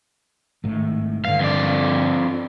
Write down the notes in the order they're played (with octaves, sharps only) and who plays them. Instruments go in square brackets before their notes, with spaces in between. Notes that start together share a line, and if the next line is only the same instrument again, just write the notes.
[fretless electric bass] G#1 A2 D#3
[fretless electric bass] G2 D3 [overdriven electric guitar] F5
[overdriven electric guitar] F2 D5